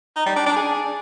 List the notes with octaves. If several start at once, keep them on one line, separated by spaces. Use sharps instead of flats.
D#4
G3
D4
D4
G#4